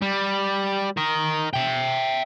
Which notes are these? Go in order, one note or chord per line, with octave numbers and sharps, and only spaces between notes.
G3
A#4 D#5
E5 G5